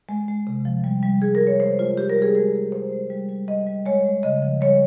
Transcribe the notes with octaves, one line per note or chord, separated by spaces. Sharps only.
G#3
G#3
C3
F3
G3
G3
G3 G#4
A#4
G3
C#5
G#3 C5
G#3 F4
G3 G4
A#4
G3
G#4
G#3 A#4
G#3
G#3 C5
G#3
G3
G3
G3 D#5
G3
G#3 C#5
G#3
C#3 D#5
F3
G3 C#5